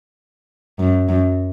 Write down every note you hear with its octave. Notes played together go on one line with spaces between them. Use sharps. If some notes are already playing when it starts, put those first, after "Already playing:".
F#2
F#2